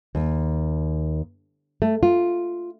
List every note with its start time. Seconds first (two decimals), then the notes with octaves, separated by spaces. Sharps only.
0.15 D#2
1.82 A3
2.03 F4